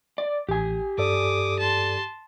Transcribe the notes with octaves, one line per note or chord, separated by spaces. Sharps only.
D5
A1 G4 G#5
G2 A4 D5 D6 D#6
A5 C6